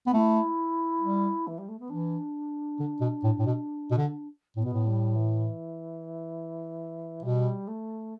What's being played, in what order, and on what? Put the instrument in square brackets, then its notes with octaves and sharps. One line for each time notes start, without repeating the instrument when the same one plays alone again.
[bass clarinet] B3
[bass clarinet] A3 [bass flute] E4
[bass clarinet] G3
[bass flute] E3
G3
A3
B3
[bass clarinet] E3 [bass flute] D4
[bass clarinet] D3
B2
A2
A2
B2
B2
D3
[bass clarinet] A2 [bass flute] B3
[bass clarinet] B2
A2
[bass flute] G3
E3
[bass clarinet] B2 [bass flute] G3
[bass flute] A3